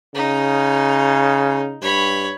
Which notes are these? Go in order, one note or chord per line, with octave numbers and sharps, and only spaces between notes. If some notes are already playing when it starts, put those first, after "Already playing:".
C#3 D#4
G2 C#5 B5